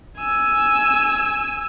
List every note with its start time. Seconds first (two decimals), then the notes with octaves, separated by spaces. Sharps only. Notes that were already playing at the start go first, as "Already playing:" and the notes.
0.18 G#5 E6